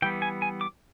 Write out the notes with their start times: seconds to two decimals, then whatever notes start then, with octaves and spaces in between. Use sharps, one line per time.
0.02 E3 G3 B3 G5
0.22 G#5
0.42 G#5
0.61 D6